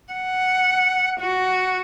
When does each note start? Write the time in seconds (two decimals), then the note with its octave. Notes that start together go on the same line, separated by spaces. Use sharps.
0.13 F#5
1.20 F#4